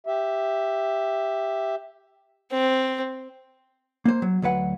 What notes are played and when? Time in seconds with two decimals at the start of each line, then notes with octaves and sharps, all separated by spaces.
0.07 G4 E5
2.51 C4
4.05 A#3 C5
4.22 F#3
4.42 D2 F#3 B4 F#5